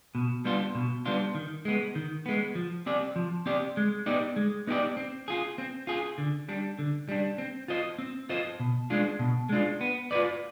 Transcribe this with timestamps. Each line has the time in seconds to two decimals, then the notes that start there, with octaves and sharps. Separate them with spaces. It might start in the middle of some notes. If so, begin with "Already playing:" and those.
0.15 B2
0.45 G3 B3 D4 F4
0.75 B2
1.06 G3 B3 D4 F4
1.35 D#3
1.65 G#3 B3
1.95 D#3
2.26 G#3 B3
2.55 F3
2.86 C4 G4 D5
3.16 F3
3.46 C4 G4 D5
3.77 G#3
4.06 B3 D#4 G4 D5
4.36 G#3
4.67 B3 D#4 G4 D5
4.97 C4
5.28 F4 G#4
5.58 C4
5.87 F4 G#4
6.18 D3
6.49 G3 D4
6.79 D3
7.09 G3 D4
7.38 C4
7.68 F4 C5 D#5
7.98 C4
8.29 F4 C5 D#5
8.60 B2
8.90 G#3 D4 F4
9.19 B2
9.49 G#3 D4 F4
9.81 B3
10.11 F4 B4 D5